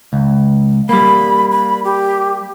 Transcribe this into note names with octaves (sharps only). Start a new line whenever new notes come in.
C#2
G3 A#3 B5
B5
G4